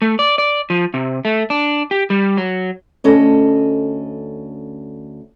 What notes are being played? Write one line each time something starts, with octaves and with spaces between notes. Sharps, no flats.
A3
D5
D5
F3
C3
A3
D4
G4
G3
F#3
D2 C#4 A4 D#5